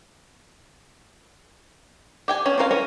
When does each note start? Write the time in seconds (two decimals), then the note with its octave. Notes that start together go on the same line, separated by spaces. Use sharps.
2.28 G4 G5 G#5
2.46 B3 C#4 F#4
2.58 C4 C#4 A#4 C5 F5
2.71 E3 C#4 A#4